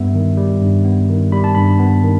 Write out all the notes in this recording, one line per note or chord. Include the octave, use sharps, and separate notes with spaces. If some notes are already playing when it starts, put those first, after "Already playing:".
Already playing: G2 G3 B3 E5
D#3
G3
G2
B3
D#3
G3 B5
A5
G2 B5
B3
D#3